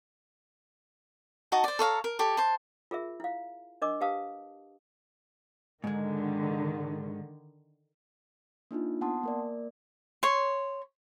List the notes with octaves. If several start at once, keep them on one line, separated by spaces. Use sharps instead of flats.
D#4 F#4 D#5 A5
C5 D5
A4 C#5 F5 A#5
A#4
G4 A4 C#5
C5 A5
F4 G#4 A#4 E5
E4 F5
D4 A#4 D#5 D6
G4 B4 F5 A5 D#6
G#2 D3 D#3 G#3
A#3 D4 D#4 F4
B3 F#5 G#5 A5 C6 D#6
A#3 A#4 D5
C#5 C6